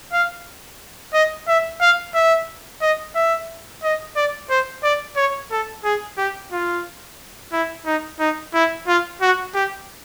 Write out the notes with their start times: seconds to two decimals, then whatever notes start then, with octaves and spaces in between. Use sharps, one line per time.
0.13 F5
1.13 D#5
1.48 E5
1.81 F5
2.14 E5
2.82 D#5
3.15 E5
3.83 D#5
4.16 D5
4.50 C5
4.83 D5
5.17 C#5
5.51 A4
5.84 G#4
6.18 G4
6.52 F4
7.52 E4
7.86 D#4
8.20 D#4
8.54 E4
8.87 F4
9.21 F#4
9.55 G4